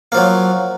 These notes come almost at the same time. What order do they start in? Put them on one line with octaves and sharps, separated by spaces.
A#3 F3 F#3